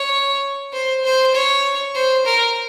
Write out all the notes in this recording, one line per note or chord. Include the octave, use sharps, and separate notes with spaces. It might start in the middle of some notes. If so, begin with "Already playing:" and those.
Already playing: C#5
C5
C5
C#5
C5
A#4